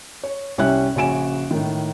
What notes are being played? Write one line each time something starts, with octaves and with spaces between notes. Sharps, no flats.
C#5
C2 G3 C#4 C#5 E5 F#6
A#1 C#3 F#4 G#5 D7 E7
A2 D#3